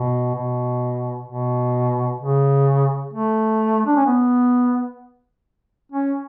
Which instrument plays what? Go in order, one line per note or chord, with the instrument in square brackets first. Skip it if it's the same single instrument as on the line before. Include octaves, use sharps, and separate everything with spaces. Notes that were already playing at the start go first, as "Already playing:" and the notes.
Already playing: [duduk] B2
B2
B2
C#3
A3
D4
C#4
B3
C#4